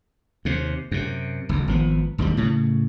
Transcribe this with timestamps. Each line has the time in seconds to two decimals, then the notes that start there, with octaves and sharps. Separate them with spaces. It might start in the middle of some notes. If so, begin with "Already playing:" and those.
0.45 D#2 C3
0.92 F#2 C3
1.49 F#1 D2
1.68 G#1 F3 B3
2.18 E1 D#2 D#3 G3
2.37 A2 C#3